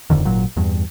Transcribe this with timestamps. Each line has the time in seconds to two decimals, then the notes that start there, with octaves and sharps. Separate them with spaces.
0.10 D1 F2 D3 D#3
0.25 G#1 A#2 F#3
0.56 E2 G2